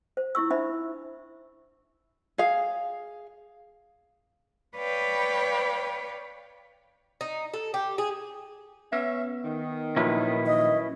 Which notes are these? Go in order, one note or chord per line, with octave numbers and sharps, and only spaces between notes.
C5
E4 F4 C#6 E6
D4 D#4 C5 E5 B5
G#4 F5
B4 C#5 D5 F5 G5
D#4
A4
G4
G#4
B3 C#4 E5
D#3
A#2 F3 F#3 C#4 E4 B4
D#5